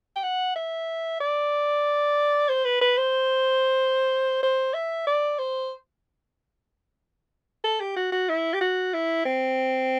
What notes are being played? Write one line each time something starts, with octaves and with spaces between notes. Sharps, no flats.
G5
F#5
E5
D5
C5
B4
B4
C5
C5
E5
D5
C5
A4
G4
F#4
F#4
E4
G4
F#4
E4
C4